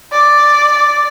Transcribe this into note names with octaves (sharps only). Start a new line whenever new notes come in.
D5